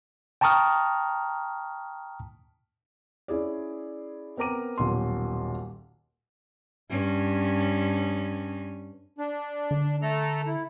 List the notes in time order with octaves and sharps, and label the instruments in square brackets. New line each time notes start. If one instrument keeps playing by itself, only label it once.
[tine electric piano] G5 A5 A#5 C#6 D#6 F6
[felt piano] C#4 E4 G#4 D5
B3 C4 A#4 A#5 D6 D#7
D#1 B1 C6
[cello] G2 C#4
[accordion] D4
[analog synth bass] D3
[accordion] A3 A4 A#5
E4